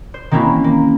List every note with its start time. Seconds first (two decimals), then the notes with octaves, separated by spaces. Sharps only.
0.14 C5
0.31 D#3 A#3 C4 C#4 E4 F#4
0.64 A#3